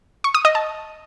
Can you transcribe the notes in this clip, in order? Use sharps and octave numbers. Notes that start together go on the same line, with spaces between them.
C#6
D#6
D#5
A5